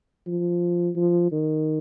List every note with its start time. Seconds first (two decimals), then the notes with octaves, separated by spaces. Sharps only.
0.27 F3
0.96 F3
1.32 D#3